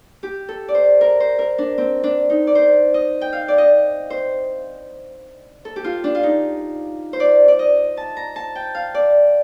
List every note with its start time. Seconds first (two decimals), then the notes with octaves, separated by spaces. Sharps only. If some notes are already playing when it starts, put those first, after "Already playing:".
0.23 G4
0.49 A4
0.68 D5
0.74 C5
1.01 A#4
1.20 C5
1.39 A#4
1.58 D4
1.78 C4
2.04 D4
2.30 D#4
2.47 D5
2.55 C5
2.94 D#5
3.21 G5
3.33 F5
3.48 D5
3.58 D#5
4.10 C5
5.65 A4
5.76 G4
5.84 F4
6.04 D4
6.15 F4
6.23 D#4
7.13 C5
7.20 D5
7.48 D5
7.59 D#5
7.97 A5
8.17 A#5
8.36 A5
8.55 G5
8.75 F5
8.94 D5